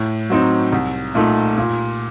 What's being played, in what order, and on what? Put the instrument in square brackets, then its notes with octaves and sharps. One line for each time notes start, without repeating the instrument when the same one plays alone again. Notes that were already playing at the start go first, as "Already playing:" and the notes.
Already playing: [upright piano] A2
F#3 C4 D#4
C2
A#2 A3 D#4
A#2